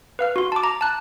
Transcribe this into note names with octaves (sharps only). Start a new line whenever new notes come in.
B4 F5 F6
F#4 C6
A5 D6
A#5
A5 F#6